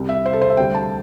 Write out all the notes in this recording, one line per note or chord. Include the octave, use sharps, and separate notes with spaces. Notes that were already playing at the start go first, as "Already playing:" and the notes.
Already playing: C2 C3 G3
E5
C5
A4
C5
E5
D2 D3 G3 G5
A5